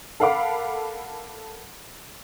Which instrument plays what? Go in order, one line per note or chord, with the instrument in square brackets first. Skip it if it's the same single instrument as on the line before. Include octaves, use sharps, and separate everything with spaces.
[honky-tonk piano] A4 A#4 F5 F#5 B5 D6